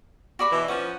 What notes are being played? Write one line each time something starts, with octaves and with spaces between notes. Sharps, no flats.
F#4 D5 B5
B2 E3
F3 C#4 B4 F#5